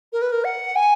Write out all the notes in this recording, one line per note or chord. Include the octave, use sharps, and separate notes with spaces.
A#4
B4
A#4
F#5
G#5